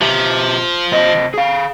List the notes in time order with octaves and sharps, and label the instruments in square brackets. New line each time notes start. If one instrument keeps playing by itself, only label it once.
[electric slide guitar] B2 G4 E5 [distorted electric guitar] F3
[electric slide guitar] C3 C5 D#5
G#4 F5